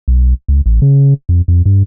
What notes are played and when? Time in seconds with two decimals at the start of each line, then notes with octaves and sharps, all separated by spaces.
0.08 B1
0.48 C#2
0.66 A1
0.82 C#3
1.29 F2
1.48 F2
1.66 G2